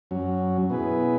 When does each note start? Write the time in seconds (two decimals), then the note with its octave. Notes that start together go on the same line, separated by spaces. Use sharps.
0.11 F#2 F#3 C#4
0.70 B2 B3 E4 G#4 B4